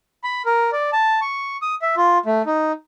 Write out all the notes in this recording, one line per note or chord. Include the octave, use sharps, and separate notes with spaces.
B5
A#4
D5
A5
C#6
D#6
E5
F4
A3
D#4